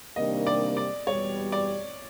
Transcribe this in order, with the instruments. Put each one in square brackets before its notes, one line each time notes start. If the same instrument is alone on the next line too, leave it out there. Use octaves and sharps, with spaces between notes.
[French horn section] C3 D#3 G3 A#3 D4 [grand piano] D#5
[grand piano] D5
D5
[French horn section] E2 B2 G3 [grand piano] C#5
[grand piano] D5